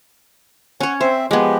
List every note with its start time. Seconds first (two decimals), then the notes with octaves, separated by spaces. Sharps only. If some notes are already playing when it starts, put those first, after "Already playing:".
0.80 C#4 C#5 F#5
1.01 C4 C5 E5
1.31 F3 G#3 B3 G4